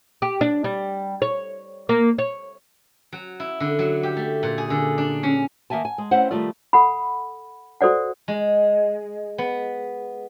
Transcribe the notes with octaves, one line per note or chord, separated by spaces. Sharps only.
G4
D4
G3
C#5
A#3
C#5
F#3
E4
D3
F#3
G4
A3
A#2
G#4
D3
D4
C#4
D#3 A#3 E5 G#5 A5
G#5
G#3
A3 C4 C#4 E4 C5 F#5
D#3 F3 G3 A3 F4 D5
A4 F#5 B5
F#4 A4 C5 D5 F#5
G#3
B3